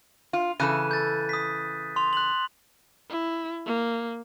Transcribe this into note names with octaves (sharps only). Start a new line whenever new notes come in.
F4
C#3 E3 A4 F#6 D#7
G6 A6
D#6 B6
C6 F7
F#6 F#7
E4
A#3